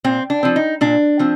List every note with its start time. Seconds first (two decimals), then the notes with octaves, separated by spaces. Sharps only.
0.04 A#2 C4
0.30 D4
0.43 F3 C4
0.56 D#4
0.81 A#2 D4
1.19 F3 C4